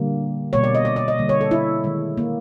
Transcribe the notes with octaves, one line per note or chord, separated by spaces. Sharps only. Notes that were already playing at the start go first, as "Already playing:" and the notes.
Already playing: D3 G3 A#3
B2 G3 A#3 C#5
D5
D#5
D5
D5
D#5
D3 G3 A#3
C#5
A4
E4
D#3 G#3
A#3